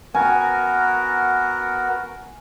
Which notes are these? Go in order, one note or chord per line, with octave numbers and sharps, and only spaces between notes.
B3 F#4 A#4 G#5